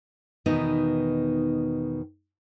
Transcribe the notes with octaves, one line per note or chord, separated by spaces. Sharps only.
E2 B2 D#3 B3 D#4